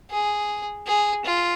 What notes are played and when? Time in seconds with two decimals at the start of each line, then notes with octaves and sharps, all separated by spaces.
0.10 G#4
0.87 G#4
1.25 F4